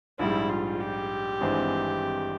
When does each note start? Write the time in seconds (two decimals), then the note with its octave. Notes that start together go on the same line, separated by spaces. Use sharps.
0.19 A#1 G#2 G3 E4
0.49 F4
0.80 G4
1.41 G#1 G2 E3 G#3 C4